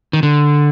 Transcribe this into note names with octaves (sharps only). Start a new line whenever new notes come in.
D#3
D3